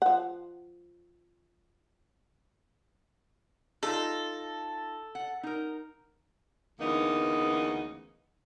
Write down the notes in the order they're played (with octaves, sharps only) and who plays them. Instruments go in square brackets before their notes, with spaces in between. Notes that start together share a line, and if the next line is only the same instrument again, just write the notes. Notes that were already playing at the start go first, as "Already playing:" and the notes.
[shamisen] F3 F#5
[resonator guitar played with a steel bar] D#4 F4 [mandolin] A4
[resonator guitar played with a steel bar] F#5
D#4 A#4
[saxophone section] D2 C#3 E3 A#3 B3 D#4